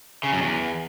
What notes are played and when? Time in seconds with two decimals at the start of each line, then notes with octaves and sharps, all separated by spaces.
0.23 C#3
0.33 F#2
0.42 E2